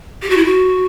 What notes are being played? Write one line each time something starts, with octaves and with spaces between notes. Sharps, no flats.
G4
F#4
E4
F#4